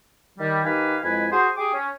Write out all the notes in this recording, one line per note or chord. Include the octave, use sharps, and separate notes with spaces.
D#3 G3
D#3 D#4 G4 B4 F5 G#5
F2 G#3 E4 B4 G#5
F#4 G#4 C5
G4 G#4 D6
C#4